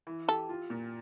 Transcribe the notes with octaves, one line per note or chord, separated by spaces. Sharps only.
E3
G4 A4
F4
A#2